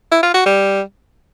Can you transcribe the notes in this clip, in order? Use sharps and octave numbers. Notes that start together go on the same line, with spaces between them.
E4
F4
F#4
G3